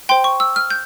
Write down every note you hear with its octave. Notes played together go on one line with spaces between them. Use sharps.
C5 G5 C6
C#6
E6
F6
G6